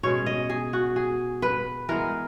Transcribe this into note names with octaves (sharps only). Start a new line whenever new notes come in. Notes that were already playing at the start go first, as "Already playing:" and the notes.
B2 G#3 C#4 C#5
D#5
G#4
F#4
G#4
B4
E3 G#3 B3 A#4